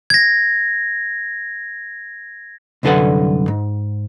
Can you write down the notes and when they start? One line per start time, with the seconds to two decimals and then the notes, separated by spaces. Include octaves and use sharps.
0.10 G#6 A#6
2.83 C2 F#2 D3 A4 B4 F#5
3.48 G#2